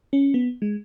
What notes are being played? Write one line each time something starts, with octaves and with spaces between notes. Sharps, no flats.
C#4
B3
G#3